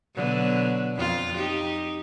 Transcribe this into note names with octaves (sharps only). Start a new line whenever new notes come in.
B2 D3 F#3
F2 F4
D#4 G4